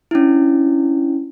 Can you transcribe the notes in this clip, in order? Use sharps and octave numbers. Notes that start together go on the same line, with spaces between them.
C#4 D4 E4